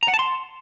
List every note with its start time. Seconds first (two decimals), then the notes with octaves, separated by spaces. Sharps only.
0.03 A#5
0.08 F#5
0.14 A5
0.19 C6